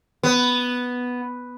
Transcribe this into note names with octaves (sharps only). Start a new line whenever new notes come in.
B3